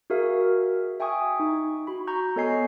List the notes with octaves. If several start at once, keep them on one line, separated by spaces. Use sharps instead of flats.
F#4 G#4 A#4 E5 F5
E5 G5 G#5 C#6 D#6
D#4
F#4 B5
A#5 C#6 G6
B3 A4 C#5 D#5 G#5 C7